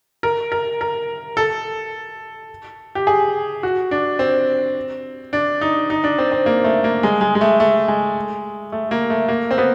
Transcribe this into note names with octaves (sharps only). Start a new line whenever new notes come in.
A#4
A#4
A#4
A4
G4
G#4
F#4
D4
C4
D4
D#4
D#4
D4
C4
C4
A#3
A3
A#3
G#3
G#3
G#3
A3
A3
G#3
A3
A#3
A3
A#3
C4
B3